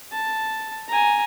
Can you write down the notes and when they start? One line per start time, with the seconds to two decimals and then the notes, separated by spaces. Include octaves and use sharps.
0.12 A5
0.88 G#5 A#5